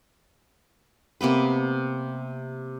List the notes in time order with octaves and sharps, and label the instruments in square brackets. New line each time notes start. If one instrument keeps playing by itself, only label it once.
[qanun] C3 A#3 B3 B4